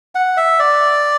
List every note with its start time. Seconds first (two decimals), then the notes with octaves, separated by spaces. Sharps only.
0.15 F#5
0.37 E5
0.59 D5